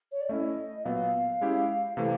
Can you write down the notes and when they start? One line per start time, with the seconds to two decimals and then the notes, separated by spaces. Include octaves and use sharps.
0.12 C#5
0.21 D5
0.29 A3 C#4 E4 D#5 E5
0.85 A#2 F#3 B3 F5
1.41 G#3 C#4 E4 G4
1.97 C3 E3 A3 F5